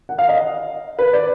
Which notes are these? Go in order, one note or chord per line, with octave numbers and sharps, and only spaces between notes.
F#5
F5
D#5
B4
D5